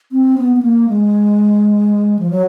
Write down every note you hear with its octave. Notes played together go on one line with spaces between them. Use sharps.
C4
B3
B3
A#3
G#3
F3
F#3